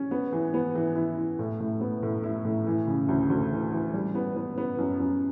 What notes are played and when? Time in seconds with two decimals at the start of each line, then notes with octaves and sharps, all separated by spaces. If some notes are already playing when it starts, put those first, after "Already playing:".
Already playing: C#4
0.11 B3
0.32 E3
0.54 B3
0.75 E3
0.96 E4
1.17 E4
1.39 A2
1.60 A2
1.81 B3
2.03 A2
2.23 E4
2.45 A2
2.67 E3
2.88 C#3
3.09 D2
3.30 D2
3.52 E3
3.72 E3
3.94 G3
4.15 B3
4.36 B3
4.58 B3
4.79 F#2
5.00 F#2